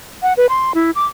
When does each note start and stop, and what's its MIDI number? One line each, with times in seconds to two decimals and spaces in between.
0.23 0.33 78
0.37 0.46 71
0.49 0.72 84
0.75 0.91 64
0.95 1.05 86